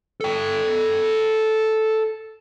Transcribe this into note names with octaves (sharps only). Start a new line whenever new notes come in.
A4 G5